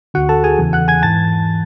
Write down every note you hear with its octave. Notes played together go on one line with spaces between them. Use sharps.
D2 D3 F#4 F#5
A4 A5
G#4 G#5
E2 C#3 E3
F#5 F#6
G#5 G#6
G#2 E3 A5 A6